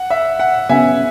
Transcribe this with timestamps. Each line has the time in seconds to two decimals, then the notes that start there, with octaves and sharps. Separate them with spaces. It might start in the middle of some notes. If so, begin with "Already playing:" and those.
Already playing: F#5
0.10 E5
0.40 F#5
0.69 C#3 F#3 B3 E5 G#5